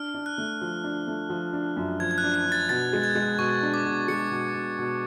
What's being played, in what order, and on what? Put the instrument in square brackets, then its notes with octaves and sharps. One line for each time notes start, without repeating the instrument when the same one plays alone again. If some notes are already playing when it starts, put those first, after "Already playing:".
Already playing: [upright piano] D4 [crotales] F6
[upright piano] D4
[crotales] F#6
[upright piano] A3
F3
D4
A3
F3
D4
F#2
[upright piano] F3 [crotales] G#6
[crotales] G#6
F#6
[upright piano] D4
[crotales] F#6
[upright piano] D4
[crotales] A6
[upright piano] B2 [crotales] A6
[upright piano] G#3
[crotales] G#6
[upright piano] G#3
[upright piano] B2 [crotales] C#6
[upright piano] D4
[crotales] D6
[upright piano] B2
[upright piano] G#3 [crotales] C#7
[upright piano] B2
B2
B2